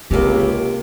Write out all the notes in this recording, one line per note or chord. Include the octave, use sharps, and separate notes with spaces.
C#2 C3 A#3 F4 G4